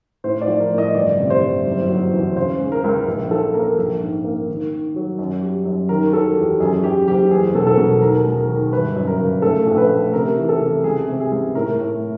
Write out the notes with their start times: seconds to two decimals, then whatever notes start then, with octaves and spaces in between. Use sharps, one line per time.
0.24 A2 C5
0.42 D5
0.48 F3
0.60 A#4
0.72 A2
0.78 D#5
0.95 G1 D5
1.19 C3
1.30 C5
1.42 G1
1.66 F#1
1.89 F#3
2.13 E2
2.37 C#3 C5
2.59 G#3
2.72 A#4
2.84 C#2
3.08 A#1
3.31 F3 A4
3.54 A#3 A#4
3.78 A#1
4.01 G#2
4.25 A#3
4.48 D#3
4.72 D#3
4.96 F#3
5.19 F#2
5.42 G3
5.65 F#2
5.89 D#3 A#4
6.13 F#3 A4
6.37 E2 G4
6.60 F#2 G#4
6.84 F#2 G4
7.08 F#1 G4
7.31 E2 G#4
7.55 B2 A4
7.67 A4
7.77 B2 A#4
8.01 D#2 A#4
8.26 G#3
8.37 A#4
8.49 D#3
8.72 G1 B4
8.96 F#2
9.07 A#4
9.19 C#3
9.42 A3 A4
9.67 A#1
9.78 B4
9.91 A3
10.13 C3 A#4
10.37 E3
10.49 A4
10.60 C3
10.84 C#2 G#4
11.08 C3
11.20 G#4
11.31 C#2
11.55 A2 A#4
11.78 A2